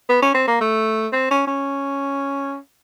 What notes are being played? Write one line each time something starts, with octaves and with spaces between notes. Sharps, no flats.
B3
C#4
C4
A#3
A3
C4
C#4
C#4